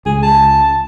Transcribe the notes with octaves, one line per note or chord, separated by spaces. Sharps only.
C#2 G#4
A5